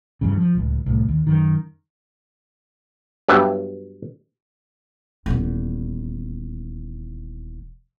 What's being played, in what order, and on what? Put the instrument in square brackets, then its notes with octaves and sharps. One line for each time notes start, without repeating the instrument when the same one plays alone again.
[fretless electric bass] E2 G2 C#3
F3
D1 C#2
C2 A2
D#2
F#2 D#3
[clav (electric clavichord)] G2 F#3 B3 G4 E5
[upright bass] D#1 E2